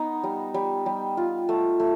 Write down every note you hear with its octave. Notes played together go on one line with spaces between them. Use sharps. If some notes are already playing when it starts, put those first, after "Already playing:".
Already playing: B3 D#4
G3
G3
G3
F4
A3
A3